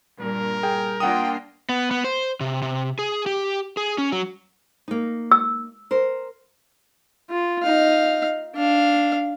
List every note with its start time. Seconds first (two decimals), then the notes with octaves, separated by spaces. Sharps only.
0.20 G2 A#2 A#4
0.63 G#4 G5
1.00 A#3 D4 F4 F#5 G5 D#6
1.69 B3
1.91 B3
2.04 C5
2.40 C3
2.62 C3
2.99 G#4
3.26 G4
3.77 G#4
3.98 C#4
4.12 F#3
4.88 A#3 D#4
5.32 E6
5.91 A#4 C5
7.30 F4
7.63 D#4 F5
8.56 D4 F5